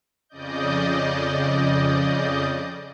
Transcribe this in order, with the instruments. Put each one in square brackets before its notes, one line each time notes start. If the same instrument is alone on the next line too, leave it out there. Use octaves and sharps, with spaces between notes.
[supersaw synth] F2 C#3 D5 D#5 G6